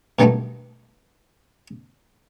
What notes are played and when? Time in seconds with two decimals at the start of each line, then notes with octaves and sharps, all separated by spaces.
0.19 G2 B2 D#3 F#3 G3 A3